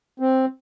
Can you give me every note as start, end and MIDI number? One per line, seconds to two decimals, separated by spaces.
0.20 0.45 60